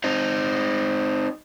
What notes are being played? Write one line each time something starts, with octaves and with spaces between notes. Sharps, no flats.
C4 D#4